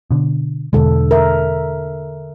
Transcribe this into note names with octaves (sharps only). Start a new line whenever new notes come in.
B2 D3
E2 B2 D3 G#3 A4
A#4 E5